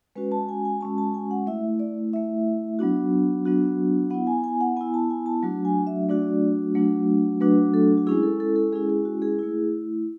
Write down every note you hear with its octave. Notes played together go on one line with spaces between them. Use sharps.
G#3 C#4 F#4 B4
A5
G#5
G#5
G#3 C#4 F#4 A5
A5
G#5
F#5
A3 E4 E5
D5
A3 E4 E5
F#3 B3 D4 F#4
F#3 B3 D4 F#4
B3 E4 F#5
G#5
G#5
F#5
B3 E4 G#5
A5
G#5
A5
F#3 A3 D4 F#4
G#5
E5
F#3 A3 D4 F#4 D5
F#3 A3 D4 F#4
F#3 A3 D4 F#4 B4
A4
F#4
G#3 C#4 E4 G#4
A4
A4
A4
G#3 C#4 E4 G#4
G#4
F#4
G#4
A3 E4